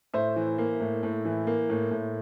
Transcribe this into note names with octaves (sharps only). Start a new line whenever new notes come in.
A2 C5 E5
E3
A#3
A2
A2
E3
A#3
A2
A2